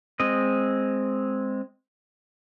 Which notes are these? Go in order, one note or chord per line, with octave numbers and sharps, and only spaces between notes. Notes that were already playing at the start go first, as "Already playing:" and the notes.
G#3 C4 D#5